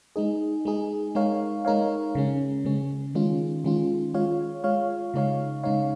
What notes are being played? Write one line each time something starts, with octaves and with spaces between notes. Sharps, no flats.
G#3 D#4 G#4
G#3 D#4 G#4
G#3 D#4 A#4 C#5 F5
G#3 D#4 A#4 C#5 F5
C#3 G#3 C#4
C#3 G#3 C#4
D#3 G#3 C#4 F4
D#3 G#3 C#4 F4
G#3 F4 C#5 F5
G#3 F4 C#5 F5
C#3 G#3 D#4 C#5 F5
C#3 G#3 D#4 C#5 F5